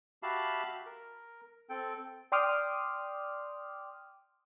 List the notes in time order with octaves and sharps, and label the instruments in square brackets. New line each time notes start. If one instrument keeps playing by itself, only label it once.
[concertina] F#4 G4 E5 F5 A5 B5
A#4
C4 A4 G5
[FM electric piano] D5 G5 C6 D6 D#6 F6